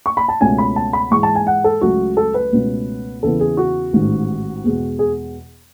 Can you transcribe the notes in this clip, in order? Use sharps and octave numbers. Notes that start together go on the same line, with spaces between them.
C#6
B5
A5
C#2 B2 A3 C#4 G#5
B5
A5
B5
G#2 E3 G#3 C#6
A5
G#5
F#5
A4
C#2 C#3 F#3 A3 F#4
A4
B4
C#2 B2 A3 C#4
E2 C#3 E3 B3 A4
G#4
F#4
A1 G#2 D#3
E2 B2 G#3
G#4